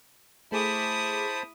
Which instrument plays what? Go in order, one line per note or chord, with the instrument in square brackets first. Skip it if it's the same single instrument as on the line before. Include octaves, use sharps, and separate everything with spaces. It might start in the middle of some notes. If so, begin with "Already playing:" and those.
[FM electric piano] A3 G#4 D6 [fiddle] E4 D#6 [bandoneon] C5 A5 B5